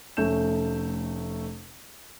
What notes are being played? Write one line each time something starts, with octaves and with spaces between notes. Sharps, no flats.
F1 A3 C#4 G6 E7